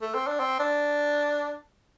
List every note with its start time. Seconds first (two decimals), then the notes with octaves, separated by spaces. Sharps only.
0.02 A3
0.14 C4
0.27 D4
0.40 C4
0.59 D4